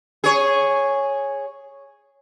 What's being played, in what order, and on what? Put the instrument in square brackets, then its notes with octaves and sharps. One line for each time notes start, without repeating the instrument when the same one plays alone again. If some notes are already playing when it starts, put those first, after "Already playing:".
[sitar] G#4 C#5